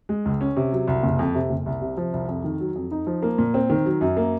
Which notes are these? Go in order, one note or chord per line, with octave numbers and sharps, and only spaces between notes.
G#3
C#2
C#4
C3
F#3
C2
F#1
F2
C3
F#1
C2
C3
F3
C2
F2
D#3
F#3
F2
D#4
F3
A#3
A#2
C4
D#3
F#3
F#2
A#3